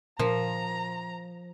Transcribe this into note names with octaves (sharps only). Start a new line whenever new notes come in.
A#2 F3 A#4 A#5